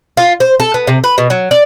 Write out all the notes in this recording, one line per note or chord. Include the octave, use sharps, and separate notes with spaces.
F4
C5
A4
B3
C3
B4
B2
F#3
D5